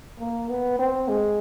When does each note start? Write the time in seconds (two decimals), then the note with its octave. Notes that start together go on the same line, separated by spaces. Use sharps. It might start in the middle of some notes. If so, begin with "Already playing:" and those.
0.20 A#3
0.49 B3
0.79 C4
1.09 G#3